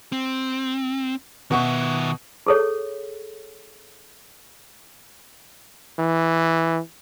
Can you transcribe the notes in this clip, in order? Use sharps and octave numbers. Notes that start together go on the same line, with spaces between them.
C4
B2 D#3 E5 F#5 C#6
G#4 A4 C#5
E3